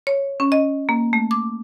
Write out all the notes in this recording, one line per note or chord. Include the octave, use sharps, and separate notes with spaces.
C#5
C#4
D#5
A#3
A3
D6